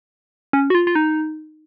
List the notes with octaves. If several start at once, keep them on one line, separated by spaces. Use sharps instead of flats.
C#4
F#4
F4
F4
D#4